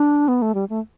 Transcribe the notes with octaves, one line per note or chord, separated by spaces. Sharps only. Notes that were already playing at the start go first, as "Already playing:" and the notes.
Already playing: D4
B3
A3
G3
A3